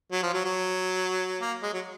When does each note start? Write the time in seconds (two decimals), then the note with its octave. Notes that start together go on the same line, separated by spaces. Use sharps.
0.12 F#3
0.23 F3
0.34 F#3
0.45 F#3
1.41 A#3
1.63 G#3
1.73 F#3